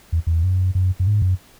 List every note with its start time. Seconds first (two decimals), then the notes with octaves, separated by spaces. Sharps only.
0.12 E2
0.27 E2
0.44 F#2
0.75 F#2
1.00 F#2
1.07 G#2
1.22 F#2